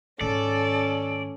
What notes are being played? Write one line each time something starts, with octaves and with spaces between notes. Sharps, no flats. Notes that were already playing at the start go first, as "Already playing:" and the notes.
G#2 D#3 C#4 A4 D5